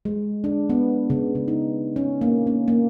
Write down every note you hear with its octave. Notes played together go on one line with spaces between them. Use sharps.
G#3
D4
B3
C#3
C#3
D#4
C#4
A#3
C#4
A#3